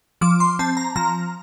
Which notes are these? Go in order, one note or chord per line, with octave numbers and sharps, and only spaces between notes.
F3 D6
C6
C4 A5
A#5
F3 A#5